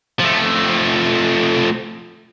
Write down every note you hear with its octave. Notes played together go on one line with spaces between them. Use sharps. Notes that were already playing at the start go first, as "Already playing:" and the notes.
F3 A3